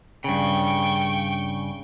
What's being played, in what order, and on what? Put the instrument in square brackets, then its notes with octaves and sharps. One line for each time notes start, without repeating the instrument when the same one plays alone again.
[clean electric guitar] G2 C#3 [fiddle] G5 C#6